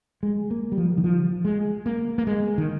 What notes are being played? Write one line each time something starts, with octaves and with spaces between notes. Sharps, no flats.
G#3
A#3
G3
F3
D#3
F3
G#3
A#3
A#3
G#3
D#3